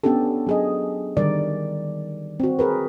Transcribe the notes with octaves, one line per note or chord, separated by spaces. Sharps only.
B3 C#4 D4 G4 A4
F#3 G#4 D#5
D3 D#3 G3 A#4 D5
C4 F#4
G#4 A#4 B4